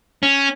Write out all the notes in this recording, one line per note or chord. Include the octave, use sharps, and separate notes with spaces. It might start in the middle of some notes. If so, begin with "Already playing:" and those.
C#4